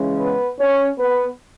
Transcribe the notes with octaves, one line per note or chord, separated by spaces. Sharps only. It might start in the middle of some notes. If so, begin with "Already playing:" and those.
Already playing: C#3 E3 G#3 C#4
B3 B4
C#4 C#5
B3 B4